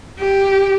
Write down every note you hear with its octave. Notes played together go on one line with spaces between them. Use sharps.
G4